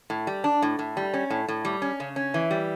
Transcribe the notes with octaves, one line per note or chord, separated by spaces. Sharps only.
A2
G3
D4
A2
A2
G3
C#4
A2
A2
G3
C#4
C#3
C#4
E3
G3